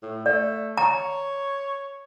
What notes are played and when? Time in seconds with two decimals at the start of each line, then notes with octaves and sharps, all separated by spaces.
0.03 A2
0.26 A3 D5
0.77 C#5 A#5